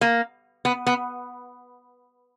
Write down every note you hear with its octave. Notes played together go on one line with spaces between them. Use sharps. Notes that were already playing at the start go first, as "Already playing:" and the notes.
A#3
B3
B3